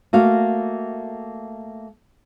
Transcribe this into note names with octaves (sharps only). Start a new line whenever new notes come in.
A3 A#3 F#4 F5